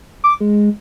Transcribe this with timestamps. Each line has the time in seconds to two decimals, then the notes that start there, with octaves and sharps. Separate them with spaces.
0.24 D6
0.40 G#3